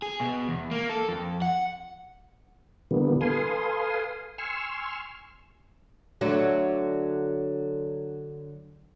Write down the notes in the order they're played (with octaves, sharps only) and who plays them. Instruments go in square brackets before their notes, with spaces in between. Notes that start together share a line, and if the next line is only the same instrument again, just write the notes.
[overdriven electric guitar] G#4
B2
E2
A#3
A4
F2
F#5
[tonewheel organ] B2 D3 E3 G3 A#3 B3
A4 B4 F5 G#5 C6 D#6
G#5 C6 C#6 E6 F6
[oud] D3 F#3 A3